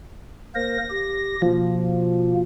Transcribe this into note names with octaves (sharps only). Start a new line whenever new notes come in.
A#3 A#4 C5 A#6
G4
B2 F3 A#3